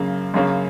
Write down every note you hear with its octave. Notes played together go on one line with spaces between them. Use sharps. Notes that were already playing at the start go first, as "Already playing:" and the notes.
Already playing: F#2 C#3 A#3
F#2 C#3 A#3 C#4